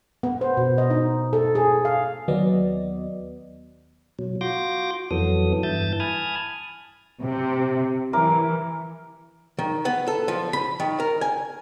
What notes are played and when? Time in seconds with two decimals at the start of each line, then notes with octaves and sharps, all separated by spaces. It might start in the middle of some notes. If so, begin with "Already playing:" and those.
0.23 B3
0.41 C5
0.57 B2
0.78 D#5
0.90 D#4
1.33 A4
1.55 G#4
1.85 F5
2.28 D#2 F#3 B3 D5 D#5
4.19 B2 F#3
4.41 F4 F#4 C6 D6 G6 A#6
5.11 F2 E3 F#3 B3 A4 D#6
5.63 G2 E3 E5 A5 G6 A6
6.00 G#5 A5 B5 D#6 F6 G#6
7.23 C3
8.13 E3 E4 A#4 D6
9.59 D#3
9.85 B3
10.07 A4
10.28 F3
10.53 B5
10.80 D#3
11.00 A#4
11.21 G#5